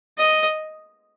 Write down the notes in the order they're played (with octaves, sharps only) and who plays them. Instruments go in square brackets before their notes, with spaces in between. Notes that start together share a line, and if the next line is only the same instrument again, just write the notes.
[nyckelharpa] D#5